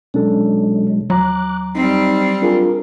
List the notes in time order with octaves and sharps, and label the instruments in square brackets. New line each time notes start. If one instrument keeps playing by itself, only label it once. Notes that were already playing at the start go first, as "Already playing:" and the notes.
[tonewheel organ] B2 F#3 G#3 [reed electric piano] C#4 D4 A4
[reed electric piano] D#2 A#5 [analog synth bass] F#3 [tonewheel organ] D6 F#6
[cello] G3 C4 [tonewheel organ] D#4
[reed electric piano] D4 F4 G#4 [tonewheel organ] A#4